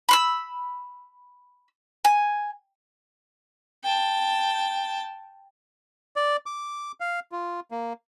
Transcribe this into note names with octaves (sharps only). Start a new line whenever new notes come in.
B5 C6 E6
G#5
G5 A5
D5
D6
F5
F4
A#3